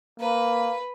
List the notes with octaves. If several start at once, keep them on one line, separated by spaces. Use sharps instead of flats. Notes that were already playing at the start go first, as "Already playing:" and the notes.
A#3 B4